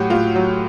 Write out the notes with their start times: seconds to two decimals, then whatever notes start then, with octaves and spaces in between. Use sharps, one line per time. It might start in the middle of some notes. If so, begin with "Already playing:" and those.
Already playing: A2 F#3 F#4 G4
0.10 A2 F4
0.36 F#3